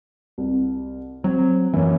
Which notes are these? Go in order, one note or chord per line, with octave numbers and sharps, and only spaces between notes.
C2
F#3 C4
F#2 E3 A#3 C#4